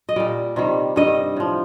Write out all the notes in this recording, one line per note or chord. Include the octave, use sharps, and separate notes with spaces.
D#5
A#2 G3 D5
C3 D#3 G3
G2 D#3 G3 D#5
A2 F3